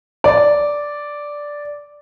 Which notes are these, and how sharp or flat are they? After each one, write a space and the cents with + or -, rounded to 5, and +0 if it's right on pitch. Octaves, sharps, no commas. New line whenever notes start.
D5 -5